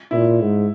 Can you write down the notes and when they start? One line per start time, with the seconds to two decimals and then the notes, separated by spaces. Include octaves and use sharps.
0.11 A#2 E4
0.40 G#2